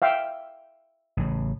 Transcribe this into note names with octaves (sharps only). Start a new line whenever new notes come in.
E5 F5 G5
A1 C#3